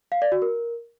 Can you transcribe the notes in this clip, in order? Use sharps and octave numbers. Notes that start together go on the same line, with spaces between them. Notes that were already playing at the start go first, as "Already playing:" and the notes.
F5
D5
F#4
A#4